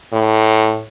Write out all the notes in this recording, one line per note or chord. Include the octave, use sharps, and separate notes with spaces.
A2